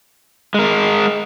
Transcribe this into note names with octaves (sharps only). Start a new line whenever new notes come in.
G#3 A#4